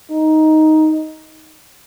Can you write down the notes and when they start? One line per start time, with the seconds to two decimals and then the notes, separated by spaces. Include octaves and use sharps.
0.11 D#4